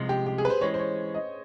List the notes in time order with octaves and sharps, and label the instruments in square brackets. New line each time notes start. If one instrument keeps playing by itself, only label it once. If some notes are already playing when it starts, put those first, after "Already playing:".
Already playing: [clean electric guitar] C2 C3 F3 G#3
[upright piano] G4
G4
G#4
B4
C5
[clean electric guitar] E3 G#3 C#4 [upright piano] C#5
[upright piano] C5
C#5
D#5